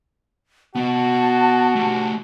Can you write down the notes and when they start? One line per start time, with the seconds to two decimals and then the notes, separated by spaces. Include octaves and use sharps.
0.75 B3 F#4 D#5 A5
1.76 A3 G4